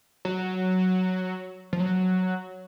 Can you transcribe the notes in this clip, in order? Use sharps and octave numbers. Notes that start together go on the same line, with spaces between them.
F#3
F3
F#3